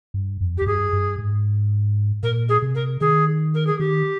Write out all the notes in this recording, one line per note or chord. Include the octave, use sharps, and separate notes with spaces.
G2
F2
F2 G4
G2 G#4
G2
G#2
A#2 A#4
G#4
C3
A#4
D#3 G#4
A#4
G#4
D#3 G4